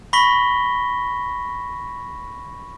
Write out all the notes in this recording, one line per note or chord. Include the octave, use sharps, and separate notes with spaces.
B5 C#6 A#6 B6 G7